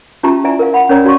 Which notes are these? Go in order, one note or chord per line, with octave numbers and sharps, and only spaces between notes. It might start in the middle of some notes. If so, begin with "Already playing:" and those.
C#4 F4 G4 E5 A5 A#5
E4 D5 E5 G#5 A#5
A#4 F5
F5 F#5 B5
C#4 A#4 C#5 D5 A#5
C#4 F#4 D5 F5 C6 C#6